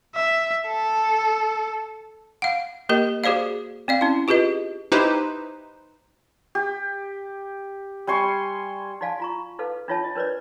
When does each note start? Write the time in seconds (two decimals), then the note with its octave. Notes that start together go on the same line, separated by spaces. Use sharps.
0.15 E5
0.66 A4
2.42 F5 F#5
2.89 A#3 G4 A#4 D#5
3.24 F#4 G#4 C5 D5 F5
3.88 C4 D5 F5
4.01 C#4 E4
4.28 F4 G4 G#4 B4 D#5
4.92 D#4 E4 G4 B4 C5
6.55 G4
8.07 G3 G#5 C6 C#6
9.01 D#4 F#4 D5 F5 G#5 A5
9.20 F4 A#5 C#6
9.59 D#4 A4 B4 F5
9.88 D4 D#4 F4 C#5 E5 A5
10.04 D#5
10.15 D4 A#4 B4 C#5 D5